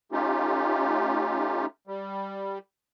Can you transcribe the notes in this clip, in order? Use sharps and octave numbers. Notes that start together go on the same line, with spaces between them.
A3 C#4 D#4 F4 G4
G3